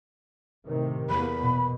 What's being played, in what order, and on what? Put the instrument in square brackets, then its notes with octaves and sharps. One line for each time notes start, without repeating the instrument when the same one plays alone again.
[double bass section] A2 C3 D#3
[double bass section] E2 A#3 [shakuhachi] B5
[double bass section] B2